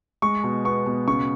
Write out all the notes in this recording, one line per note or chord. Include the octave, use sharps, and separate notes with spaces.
G#3 C#6
B2
B3 C#6
B2
C#3 C#6